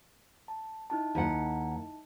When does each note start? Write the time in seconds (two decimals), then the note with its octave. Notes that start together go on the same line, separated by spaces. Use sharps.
0.48 A5
0.90 D#4 E4 A5
1.15 D#2 F#5